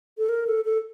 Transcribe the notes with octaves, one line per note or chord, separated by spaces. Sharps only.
A4
A#4
A4
A4